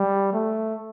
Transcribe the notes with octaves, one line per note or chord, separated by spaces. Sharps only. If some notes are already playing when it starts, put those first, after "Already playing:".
Already playing: G3
A3